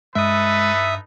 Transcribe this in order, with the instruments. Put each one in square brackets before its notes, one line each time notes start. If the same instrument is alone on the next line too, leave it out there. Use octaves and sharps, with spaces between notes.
[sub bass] G2 [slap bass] G#3 [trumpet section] D#4 A4 B4 [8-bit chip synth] E5 D#6